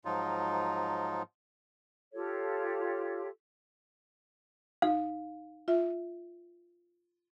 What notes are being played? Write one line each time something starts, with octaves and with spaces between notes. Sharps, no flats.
G#2 F3 F#3 D#4 F4
F4 G4 A4 C#5
D#4 F5
F4 E5